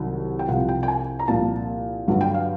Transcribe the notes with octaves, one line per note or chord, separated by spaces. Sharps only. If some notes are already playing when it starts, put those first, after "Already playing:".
Already playing: C2 C3 D#3 F#3
G5
C2 C3 F3 F#5
G5
G5
G#5
A#5
C2 A#2 F3 A5
G2 D3 F#3
G5
F5